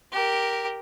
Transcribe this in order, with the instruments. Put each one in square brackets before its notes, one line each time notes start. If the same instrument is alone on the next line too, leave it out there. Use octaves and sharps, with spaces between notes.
[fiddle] G4 A#4